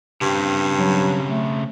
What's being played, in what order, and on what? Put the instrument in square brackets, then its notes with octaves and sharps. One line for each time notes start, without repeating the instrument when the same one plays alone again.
[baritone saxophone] G2 [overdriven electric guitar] C#3 C4
[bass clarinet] F#3
A3